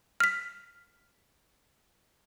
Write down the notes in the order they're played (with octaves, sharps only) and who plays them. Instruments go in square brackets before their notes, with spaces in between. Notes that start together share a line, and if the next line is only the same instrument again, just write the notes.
[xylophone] F6 B6